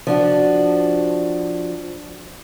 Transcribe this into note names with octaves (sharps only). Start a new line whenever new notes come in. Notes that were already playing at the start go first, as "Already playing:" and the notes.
F3 D4 F#4